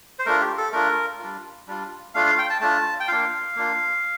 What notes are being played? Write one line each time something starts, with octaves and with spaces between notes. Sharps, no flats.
C5
A3 D4 F4 A#4
G4
A4
A3 D4 F4 A#4
G3 D4 F4
G3 D4 F4
A3 D4 F4 F5
F5
G5
A5
A3 D4 F4 A5
G5
A#3 D4 F4 F5
A#3 D4 F4